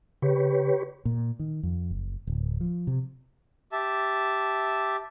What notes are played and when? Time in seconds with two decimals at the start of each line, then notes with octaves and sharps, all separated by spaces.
0.22 C#3 G4 B4 C#5
1.05 A#2
1.39 D#3
1.63 F2
1.91 F#1
2.27 D1
2.61 F3
2.87 C3
3.72 G4 E5 A5